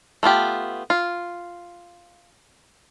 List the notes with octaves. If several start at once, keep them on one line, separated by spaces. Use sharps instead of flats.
A3 B3 F4 G4
F4